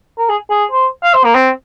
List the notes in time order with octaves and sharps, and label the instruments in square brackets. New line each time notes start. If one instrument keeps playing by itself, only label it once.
[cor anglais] A#4
G#4
G#4
C5
F5
C5
A#3
C4